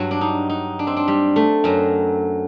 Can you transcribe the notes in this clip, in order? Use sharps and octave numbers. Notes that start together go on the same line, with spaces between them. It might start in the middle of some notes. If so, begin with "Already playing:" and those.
Already playing: G2 F#3 F#4
D4
D#4
D#4
D4
C4
D4
G3
A3
F#2 F#3